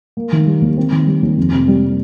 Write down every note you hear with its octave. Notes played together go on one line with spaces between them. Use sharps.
A#3
D#3
G3
D#2
C4
D#3
G3
D#2
F2
C3
G3